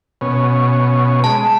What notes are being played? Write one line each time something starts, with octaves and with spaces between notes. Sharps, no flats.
B2 C#4
G#3 A5